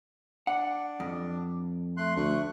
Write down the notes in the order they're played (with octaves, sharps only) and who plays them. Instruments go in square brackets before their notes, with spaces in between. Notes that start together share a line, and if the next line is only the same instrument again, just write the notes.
[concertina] D4 [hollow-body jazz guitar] F#5
[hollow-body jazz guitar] F2
[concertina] A3 C6 F#6
[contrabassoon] D2 [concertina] A3 C#6 F#6